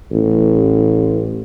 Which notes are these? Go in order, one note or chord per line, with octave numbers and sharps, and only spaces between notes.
A1